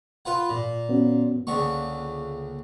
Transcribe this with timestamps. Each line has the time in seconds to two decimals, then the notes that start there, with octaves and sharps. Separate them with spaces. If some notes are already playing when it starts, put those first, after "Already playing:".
0.25 F4 B4 F#5
0.49 A#2
0.89 B3 C#4 F#4
1.47 C#2 D3 A#3 C#6